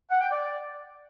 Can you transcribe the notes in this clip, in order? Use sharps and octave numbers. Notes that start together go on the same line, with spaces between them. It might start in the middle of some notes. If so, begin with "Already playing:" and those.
F#5
G5
D5